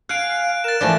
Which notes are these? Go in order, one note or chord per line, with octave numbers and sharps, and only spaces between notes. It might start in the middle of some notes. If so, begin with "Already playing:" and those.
F5 F#5 G#5 F#6 D7
A#4 A6 E7
E3 F3 A3 D5